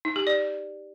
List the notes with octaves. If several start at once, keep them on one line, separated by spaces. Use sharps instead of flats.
D#4
G4
D5